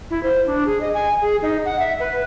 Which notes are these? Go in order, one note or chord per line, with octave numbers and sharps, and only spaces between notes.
E4
C5
D4
G#4
D#5
G#5
G#4
D#4
F#5
E5
B4